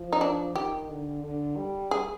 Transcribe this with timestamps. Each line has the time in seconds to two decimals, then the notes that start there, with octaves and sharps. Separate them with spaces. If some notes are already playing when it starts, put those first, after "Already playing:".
Already playing: F3
0.13 D#4
0.21 D4
0.55 D#3 G4
0.89 D3
1.24 D3
1.57 G3
1.91 G#4